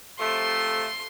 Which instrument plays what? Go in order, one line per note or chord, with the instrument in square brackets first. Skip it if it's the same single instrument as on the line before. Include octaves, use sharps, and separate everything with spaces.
[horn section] C3 F3 A3 [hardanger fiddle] C6